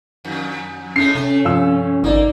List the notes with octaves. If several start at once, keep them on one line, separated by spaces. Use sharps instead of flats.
F2 D#3
A2 G#3 A3 C#4 C7
C3 A3
G2 C3 F3 F5 E6
G#1 A#3 D#4 D5